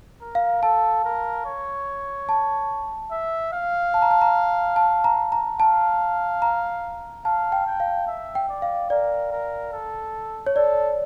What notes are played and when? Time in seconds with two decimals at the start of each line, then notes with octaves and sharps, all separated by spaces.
0.21 A#4
0.35 F5
0.63 A4 A5
1.05 A#4
1.46 C#5
2.29 A5
3.11 E5
3.53 F5
3.94 A5
4.02 A#5
4.11 A5
4.22 A#5
4.76 A5
5.04 A#5
5.32 A#5
5.59 F5 A5
6.42 A#5
7.25 F5 A5
7.52 G5
7.67 G5
7.80 F5
8.07 E5
8.35 G5
8.49 D5
8.62 F5
8.90 A#4 D5
9.32 A#4
9.73 A4
10.47 C#5
10.56 A4 D5